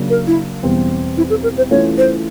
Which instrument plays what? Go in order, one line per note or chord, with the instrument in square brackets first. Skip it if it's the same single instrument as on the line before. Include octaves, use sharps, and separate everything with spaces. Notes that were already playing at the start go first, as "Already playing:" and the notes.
Already playing: [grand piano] C#3 F#3 A#3 D4
[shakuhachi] A#4
E4
[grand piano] E2 B2 G3 C4
[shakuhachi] E4
A4
A#4
C5
[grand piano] E3 A3 C#4 F4 [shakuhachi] C#5
[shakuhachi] C5